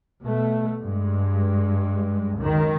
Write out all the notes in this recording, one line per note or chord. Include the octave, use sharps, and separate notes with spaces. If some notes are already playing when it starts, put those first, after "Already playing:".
B2 A3
G2 G#3
C#2 F#2 D#3